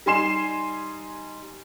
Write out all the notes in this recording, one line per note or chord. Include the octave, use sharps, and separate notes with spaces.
G3 D#4 G#5 C6 C7 E7